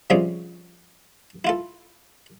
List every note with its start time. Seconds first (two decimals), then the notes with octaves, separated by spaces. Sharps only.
0.10 C3 F3 G3 G#3 C#4 G#4
1.45 E4 F4 A4